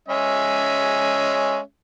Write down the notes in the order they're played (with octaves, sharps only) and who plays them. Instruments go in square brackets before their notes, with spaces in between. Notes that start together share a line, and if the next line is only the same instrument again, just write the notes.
[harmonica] G#3 C#4 E5